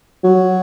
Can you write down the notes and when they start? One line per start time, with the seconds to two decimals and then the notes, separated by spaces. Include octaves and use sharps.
0.24 F#3